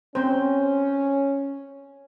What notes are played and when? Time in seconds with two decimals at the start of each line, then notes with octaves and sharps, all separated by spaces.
0.15 C4 C#4 C5